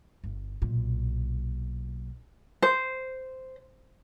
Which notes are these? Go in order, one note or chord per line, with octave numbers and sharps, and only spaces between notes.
G1
B1 A#2
C5